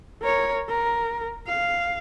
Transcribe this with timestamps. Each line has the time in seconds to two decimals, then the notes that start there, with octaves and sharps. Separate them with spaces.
0.22 A#4 C#5
0.69 A#4
1.48 F5